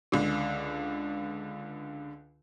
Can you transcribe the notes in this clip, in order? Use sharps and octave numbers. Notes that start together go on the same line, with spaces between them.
C#2 D3